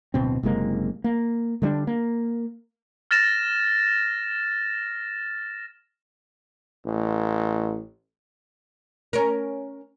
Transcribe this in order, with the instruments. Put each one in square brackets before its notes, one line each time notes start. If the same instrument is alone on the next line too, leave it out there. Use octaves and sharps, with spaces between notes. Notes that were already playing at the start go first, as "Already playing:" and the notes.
[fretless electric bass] D1 B2 C4
F#1 C3 G#3 A#3
A#3
D3 G3 A3 D4
A#3
[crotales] F6 A6 A#6 E7
[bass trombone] A1
[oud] C#4 A#4